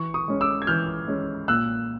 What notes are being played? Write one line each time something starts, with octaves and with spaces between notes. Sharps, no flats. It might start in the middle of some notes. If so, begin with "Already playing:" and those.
Already playing: E3 C#6
C#6 D#6
G#3 C#4
D6 E6
G#6
E3 F6 G6
G#3 C#4
A#2 E6 F#6